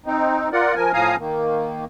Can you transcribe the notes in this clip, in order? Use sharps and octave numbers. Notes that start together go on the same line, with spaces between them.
C4 D#4
F4 A#4 D5 F#5
F3 A#4 G#5
A2 F3 F5 G#5 A#5 D#6
D#3 A#3